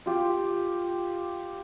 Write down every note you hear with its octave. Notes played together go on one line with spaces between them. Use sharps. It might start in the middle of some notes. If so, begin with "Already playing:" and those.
F4 G4